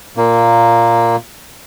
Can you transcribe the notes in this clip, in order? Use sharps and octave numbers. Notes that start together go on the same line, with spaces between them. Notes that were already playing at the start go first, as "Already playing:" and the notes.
A#2 A#3